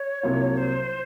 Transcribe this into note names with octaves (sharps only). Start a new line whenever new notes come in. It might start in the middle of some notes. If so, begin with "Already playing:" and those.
Already playing: C#5
C2 C3 F#3 A#3 F4
C5